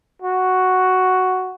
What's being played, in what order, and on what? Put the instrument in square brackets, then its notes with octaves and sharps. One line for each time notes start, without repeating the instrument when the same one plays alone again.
[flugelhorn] F#4